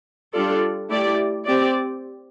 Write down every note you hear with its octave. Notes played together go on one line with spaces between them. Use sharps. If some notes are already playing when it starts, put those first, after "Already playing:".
G3 D4 F4 A4 D5
A3 E4 G4 D5
C4 G4 D5